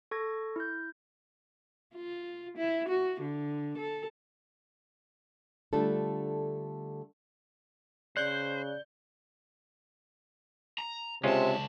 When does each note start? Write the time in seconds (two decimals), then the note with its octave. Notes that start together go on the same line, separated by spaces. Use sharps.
0.11 A4 C#6 G#6 A#6
0.56 E4 G6
1.95 F4
2.57 E4
2.89 F#4
3.21 D3
3.78 A4
5.73 D3 G3 A3 D4 F4 A4
8.17 C#3 C5 D5 F#6 G6 G7
10.78 A#5
11.24 C#2 C3 G#3 C#4 F4 A5